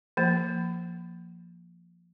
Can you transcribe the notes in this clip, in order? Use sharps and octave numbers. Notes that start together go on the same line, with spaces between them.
F3 A#3